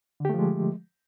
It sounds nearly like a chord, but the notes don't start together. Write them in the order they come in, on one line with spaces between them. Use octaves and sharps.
D3 G4 A3 F3 G#3